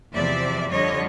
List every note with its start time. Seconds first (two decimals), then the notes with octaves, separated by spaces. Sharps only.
0.13 E2 C3 F3 D5 E5
0.70 F2 D3 G3 C#5 D#5